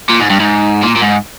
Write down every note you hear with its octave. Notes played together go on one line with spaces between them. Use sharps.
A#2
G#2
G2
G#2
A#2
A#2
G#2